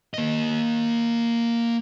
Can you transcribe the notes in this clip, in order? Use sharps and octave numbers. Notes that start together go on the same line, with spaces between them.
A#3 D#5